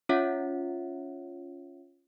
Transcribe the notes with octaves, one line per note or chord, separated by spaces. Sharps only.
C#4 F4 C#5 E5 F#5